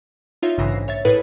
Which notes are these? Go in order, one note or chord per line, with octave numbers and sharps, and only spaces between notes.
D#4 F4 C#5 E5
A#1 G#2 C#3 E3 A#6 C7
C#5 E5 A6
A2 E4 G#4 A4 B4 A6